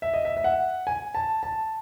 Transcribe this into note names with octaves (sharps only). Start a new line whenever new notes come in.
E5
D#5
E5
E5
F#5
G#5
A5
A5